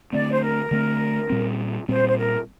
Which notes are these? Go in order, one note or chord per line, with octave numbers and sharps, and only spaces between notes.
D3 A3 C4 D5
C5
A#4
D3 A3 C4
A#2 G3 C4
A#2 G3 C4 C5
C5
A#4